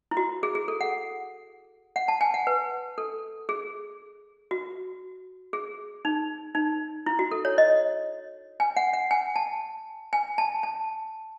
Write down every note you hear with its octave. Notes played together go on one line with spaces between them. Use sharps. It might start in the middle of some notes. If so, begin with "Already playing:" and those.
E4
F#4
G#4
G#4
A4
F#5
F#5
A5
G#5
F#5
B4
A4
G#4
F#4
G#4
D#4
D#4
E4
F#4
A4
C#5
D#5
G#5
F#5
F#5
G#5
A5
G#5
A5
A5